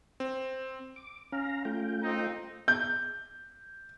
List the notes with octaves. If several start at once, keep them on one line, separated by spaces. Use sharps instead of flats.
C4
D6
C#4 F5 A#5
A3 F4 G5
C4 D#4
G6